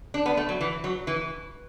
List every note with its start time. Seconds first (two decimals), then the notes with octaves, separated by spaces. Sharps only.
0.14 D4
0.26 B3
0.37 A3
0.49 F#3
0.61 E3
0.84 F#3
1.07 E3